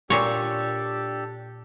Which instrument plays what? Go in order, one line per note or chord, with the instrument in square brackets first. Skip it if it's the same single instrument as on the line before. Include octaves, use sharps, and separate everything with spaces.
[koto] A#2 C#5 [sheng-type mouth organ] D4 G4 A4